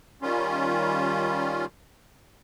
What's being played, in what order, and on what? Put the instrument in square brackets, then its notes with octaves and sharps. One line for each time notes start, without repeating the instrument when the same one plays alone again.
[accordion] D#3 G3 C#4 F4